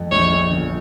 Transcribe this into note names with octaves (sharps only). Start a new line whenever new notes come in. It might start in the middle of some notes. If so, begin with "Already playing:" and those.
Already playing: F2
A#1 C#5
A#1
G1